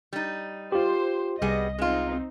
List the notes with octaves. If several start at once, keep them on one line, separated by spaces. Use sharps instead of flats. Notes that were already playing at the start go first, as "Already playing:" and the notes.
G3 D#4
F4 G4 C5
C2 G3 B3 G#4 D#5
G#3 C4 D#4 F4